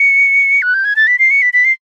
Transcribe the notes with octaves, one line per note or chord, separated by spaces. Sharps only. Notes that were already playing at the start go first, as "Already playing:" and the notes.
Already playing: C#7
F#6
G6
G#6
A6
B6
C7
C#7
B6
B6
C7